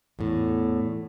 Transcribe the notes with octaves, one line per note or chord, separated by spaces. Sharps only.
E2 A2